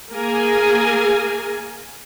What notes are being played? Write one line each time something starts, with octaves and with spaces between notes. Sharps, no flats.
A#3 G#4 A#4 G#5